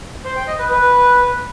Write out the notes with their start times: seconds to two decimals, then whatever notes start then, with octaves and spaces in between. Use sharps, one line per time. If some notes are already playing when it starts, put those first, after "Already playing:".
0.25 C5
0.36 G5
0.47 D#5
0.59 B4
0.70 B4